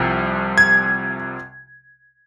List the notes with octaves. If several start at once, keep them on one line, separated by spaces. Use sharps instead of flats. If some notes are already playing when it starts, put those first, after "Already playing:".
Already playing: C2 C3 F3
G#6